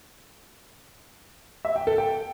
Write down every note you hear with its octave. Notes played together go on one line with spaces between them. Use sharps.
E5
G5
A4
G5